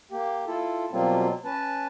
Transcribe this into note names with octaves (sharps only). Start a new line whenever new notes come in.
A#3 G4
E4 F4 A4
B2 F#3 G3 A#3 C4 F4
C#4 B4 A5